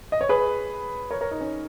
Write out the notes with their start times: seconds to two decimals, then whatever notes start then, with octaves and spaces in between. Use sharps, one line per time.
0.12 D#5
0.21 C#5
0.29 G#4 B4
1.11 A#4 C#5
1.21 A#4 C#5
1.31 D#4
1.41 C#4